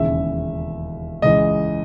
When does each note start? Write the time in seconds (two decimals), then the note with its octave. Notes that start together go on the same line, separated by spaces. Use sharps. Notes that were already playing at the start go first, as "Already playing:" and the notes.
Already playing: E1 D#2 C#3 E3 E5
1.22 C#2 C#3 E3 D#5